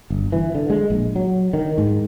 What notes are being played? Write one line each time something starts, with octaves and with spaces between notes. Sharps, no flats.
G1
E3
D3
G#3
A#1
F#3
D#3
G#2